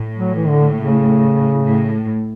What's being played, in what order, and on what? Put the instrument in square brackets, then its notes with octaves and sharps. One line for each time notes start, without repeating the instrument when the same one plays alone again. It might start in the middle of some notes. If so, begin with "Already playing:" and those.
Already playing: [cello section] A2
[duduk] F#3
E3
D3
C#3
[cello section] A2